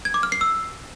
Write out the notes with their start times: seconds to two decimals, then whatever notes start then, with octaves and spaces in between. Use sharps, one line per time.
0.05 G#6
0.14 D6
0.23 F6
0.32 C7
0.41 E6